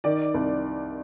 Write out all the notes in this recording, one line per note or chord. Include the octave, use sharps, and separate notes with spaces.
D#3 D5
C2